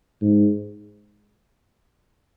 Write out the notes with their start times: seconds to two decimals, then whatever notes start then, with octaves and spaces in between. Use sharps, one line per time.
0.21 G#2